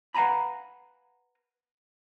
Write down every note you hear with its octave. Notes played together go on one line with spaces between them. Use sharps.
B4 F5 F#5 G#5 A#5 B5